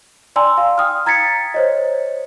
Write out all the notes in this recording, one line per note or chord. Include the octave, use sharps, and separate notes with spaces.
D5 G5 G#5 A#5 C6 E6
F5
G5 D#6 F6
A#5 G#6 A6 B6 C#7
C5 C#5 D#5